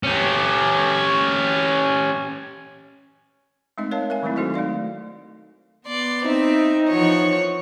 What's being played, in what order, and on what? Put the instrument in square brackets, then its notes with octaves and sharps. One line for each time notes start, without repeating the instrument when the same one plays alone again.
[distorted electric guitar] C#4 G4
[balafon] G#3 A3 C4 D#4 D#5 E5
A#4 C#5 D#5 F5 A5
A#4 E5 G#5
D#3 F#3 G#3 A3 C4 E4
D#4 F#4 A4 C5 D#5
A3 D#4 D5 F5
[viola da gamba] B3 [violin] D5 C6
[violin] C4 E5 [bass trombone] D#4
[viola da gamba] E3 F3 [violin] C#5 F#5